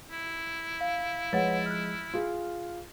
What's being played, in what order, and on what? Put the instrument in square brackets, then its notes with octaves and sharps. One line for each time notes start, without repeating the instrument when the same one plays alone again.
[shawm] E4
[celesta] F5
[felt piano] F3 G#3 A6 [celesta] B4 C#5 F#5
[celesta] F6 F#6
[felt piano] F4 G#4